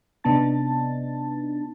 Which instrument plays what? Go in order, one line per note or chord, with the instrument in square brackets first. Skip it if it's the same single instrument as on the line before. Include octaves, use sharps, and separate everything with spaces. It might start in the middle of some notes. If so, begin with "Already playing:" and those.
[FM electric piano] C3 B3 D4 D#4 A5 A6